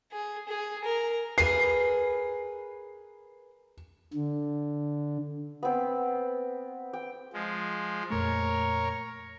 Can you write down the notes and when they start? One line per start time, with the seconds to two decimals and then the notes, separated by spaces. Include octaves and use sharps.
0.12 G#4
0.49 G#4
0.84 A#4
1.38 G#4 A#4 B4 C7
4.14 D3
5.63 B3 C4
6.93 G5
7.33 F3 G#3
8.10 F2 A#2 A3 A#4 C#5